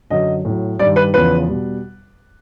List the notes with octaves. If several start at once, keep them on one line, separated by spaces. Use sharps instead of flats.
F#2 D3 F#3 D#5
A2
F#3
G2 D#3 G3 D5
B4
E2 C#3 F3 B4
B2 G3